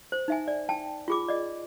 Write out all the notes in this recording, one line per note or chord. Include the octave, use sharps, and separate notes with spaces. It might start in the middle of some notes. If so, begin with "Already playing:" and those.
C5
D#4 E5 G#5
D5
G5 A5
F4 G#4 D6
D5 D#5